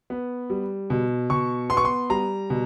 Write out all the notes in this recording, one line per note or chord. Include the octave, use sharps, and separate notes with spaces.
B3
G3
B2
B2 C#6
B3 C6
C#6
C6
G3 A#5
B2